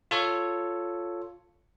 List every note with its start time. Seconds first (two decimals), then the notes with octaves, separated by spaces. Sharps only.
0.11 F4 A4 C#5